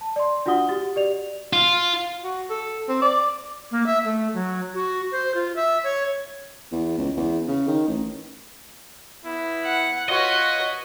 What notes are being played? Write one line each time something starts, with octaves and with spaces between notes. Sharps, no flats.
A5
D5 C6
D4 F4 F#4 F#5 D#6 G7
F#4 G4 A6
G4 D5 F7
F4
F#4
A4
C4
D5
A#3
E5
A3
F#3
F#4
C5
F4
E5
C#5
E2
C#2
E2
C#3
D#3
A1
B3 E4
F#5
F4 F#4 B4 C#5 D#5